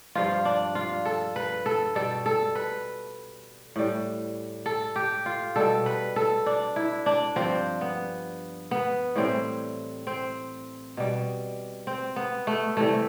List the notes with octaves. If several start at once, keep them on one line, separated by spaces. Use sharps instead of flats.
G2 F3 F4
D4
F4
A4
B4
A4
B2 G3 A4
A4
B4
A2 G3
A4
G4
F4
B2 G3 A4
B4
A4
D4
E4
D4
G2 F3 C4
B3
B3
A2 E3 G3 C4
C4
B2 G3
C4
B3
A3
C3 E3 G3 A3